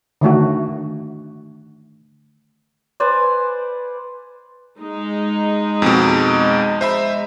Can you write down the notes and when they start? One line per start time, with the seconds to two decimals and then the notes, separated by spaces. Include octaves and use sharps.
0.21 D3 D#3 A3 F#4
3.00 B4 C5 D5 G#5
4.78 G#3 D#4
5.82 F2 B2
6.81 C5 E5 B5